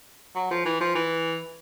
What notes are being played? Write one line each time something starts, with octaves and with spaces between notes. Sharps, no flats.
F#3
F3
E3
F3
E3